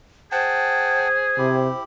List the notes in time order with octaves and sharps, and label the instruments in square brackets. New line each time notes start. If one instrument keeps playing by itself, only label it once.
[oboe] G#4 [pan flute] C5 [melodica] F#5 G5 A5
[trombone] C3 [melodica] E4 G4